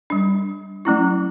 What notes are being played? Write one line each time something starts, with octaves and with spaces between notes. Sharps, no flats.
G3 D4
F#3 A3 C#4 E4